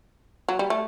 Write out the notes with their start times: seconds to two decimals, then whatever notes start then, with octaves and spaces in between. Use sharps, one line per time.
0.49 F#3
0.59 G3
0.70 A3